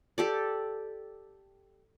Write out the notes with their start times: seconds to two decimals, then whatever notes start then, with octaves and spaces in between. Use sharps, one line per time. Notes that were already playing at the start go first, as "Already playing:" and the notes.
0.18 G4 A4 D5